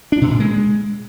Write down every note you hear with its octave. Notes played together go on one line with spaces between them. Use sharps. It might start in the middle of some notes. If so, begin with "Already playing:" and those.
D4
B2
A#2
G#3